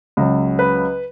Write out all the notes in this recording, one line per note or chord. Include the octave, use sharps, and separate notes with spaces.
C#2 C#3 F#3
B4